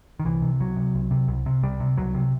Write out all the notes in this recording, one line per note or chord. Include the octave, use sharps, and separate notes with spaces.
D#3
C2 E3
C3
C2 F#3
C3
C2
C3
C2
C3
C2 G3
C3
C2 F#3
C3